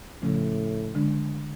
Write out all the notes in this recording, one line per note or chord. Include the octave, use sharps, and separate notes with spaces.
A2 C#3 F3 A3 C#4
D3 G#3 D4